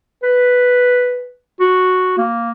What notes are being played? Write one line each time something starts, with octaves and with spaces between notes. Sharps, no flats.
B4
F#4
A#3